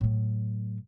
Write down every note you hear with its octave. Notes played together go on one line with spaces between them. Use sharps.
A2 F#3